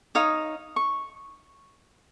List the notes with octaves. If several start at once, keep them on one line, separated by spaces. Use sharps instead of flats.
D#4 C#5 F5 D#6
C#6